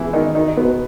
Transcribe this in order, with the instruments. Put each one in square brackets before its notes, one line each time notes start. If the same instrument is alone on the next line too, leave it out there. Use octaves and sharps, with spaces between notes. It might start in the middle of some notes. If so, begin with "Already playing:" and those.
Already playing: [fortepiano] E3 E4 G#4
D#3 D#4
D#3 D#4
B2 B3